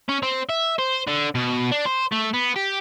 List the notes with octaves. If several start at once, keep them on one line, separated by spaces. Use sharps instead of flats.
C#4
C4
E5
C5
D3
B2
D4
C5
A3
B3
G4